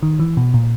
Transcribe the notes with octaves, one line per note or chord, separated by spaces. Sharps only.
D#3
E3
B2
A#2